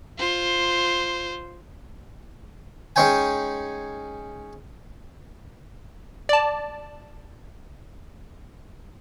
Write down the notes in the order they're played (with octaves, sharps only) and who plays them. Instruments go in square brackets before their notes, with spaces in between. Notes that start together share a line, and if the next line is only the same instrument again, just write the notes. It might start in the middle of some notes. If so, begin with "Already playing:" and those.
[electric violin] F4 C5
[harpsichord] G#3 C#4 D#4 C#5 G5 G#5
[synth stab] D5 A5